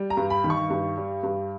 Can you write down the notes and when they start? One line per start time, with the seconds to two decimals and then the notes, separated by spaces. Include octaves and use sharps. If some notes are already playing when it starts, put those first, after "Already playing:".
Already playing: G3
0.10 A#5
0.17 G2
0.30 B5
0.44 D#3 B5
0.50 C#6
0.70 G2
0.97 G3
1.23 G2